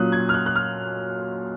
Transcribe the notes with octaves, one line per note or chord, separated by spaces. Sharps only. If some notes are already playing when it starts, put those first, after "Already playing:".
Already playing: A#2 F#3 C#4 F4 D#6 F#6
G#6
F6
F#6
F#6
F6